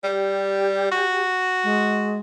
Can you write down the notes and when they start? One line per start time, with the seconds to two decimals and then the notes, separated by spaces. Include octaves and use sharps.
0.04 G3 G4
0.91 F#4
1.64 G#3